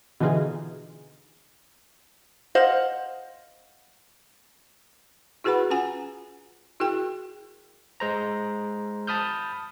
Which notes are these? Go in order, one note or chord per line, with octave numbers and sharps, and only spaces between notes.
B2 D3 E3 D#4 F4 G#4
C5 D#5 F5 F#5
E4 F#4 G#4 B4 F#5 B5
C#4 F4 F#5 G#5
E4 F#4 G#4 A#4 G5
G#3 C5 A#5
A5 B5 D#6 F6 G6